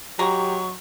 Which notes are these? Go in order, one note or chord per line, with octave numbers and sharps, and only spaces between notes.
F#3 G#3 G4 A#5 C#6